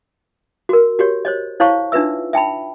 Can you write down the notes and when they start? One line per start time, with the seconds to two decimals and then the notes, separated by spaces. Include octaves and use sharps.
0.69 F#4 A#4
0.99 F#4 G4 C#5
1.25 C5 C#5 D#5
1.60 E4 C5 C#5 F5 A5 C#6
1.92 D4 D#4 F4 B4 E5 E6
2.33 E5 G5 A5 B5